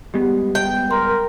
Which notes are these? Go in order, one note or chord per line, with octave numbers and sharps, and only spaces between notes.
G3 G#3 B3 G4
G5
A#4 C6